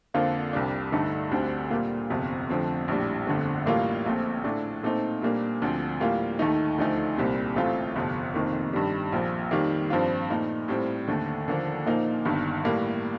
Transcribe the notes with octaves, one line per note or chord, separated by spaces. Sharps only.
F2 D3 F3 A#3 F4
C2 C3 G3 D4
G2 D3 A3 D#4
D2 D3 G3 C4
A#2 G3 A#3 F4
G1 F2 C3
F2 D3 F3 A3 C4
A#1 A2 G3 D4
G1 F2 D3 A3
A1 A2 G3 A#3 F4
A#1 A#2 A3 C4
A2 A3 D4
A#2 A3 C4 D#4
A#2 G3 A#3 D4
D2 D3 F3 C4
A2 G3 A#3 F4
D#2 D#3 A3 D#4
D2 D3 F3 A3 D#4
C2 A#2 G3 C4
A1 A2 A3 C4 F4
G1 F2 C3 F3
F1 F2 D#3 A#3
G2 D#3 G3
A#1 A#2 F3
F2 D#3 G3 A#3
G2 F3 C4 F4
A#2 A3 D#4
A2 G3 C4
D#2 D3 A3
D#2 D3 F3 A#3 D4
A#2 F3 A#3 D#4
G1 G2 D#3
A2 G3 A#3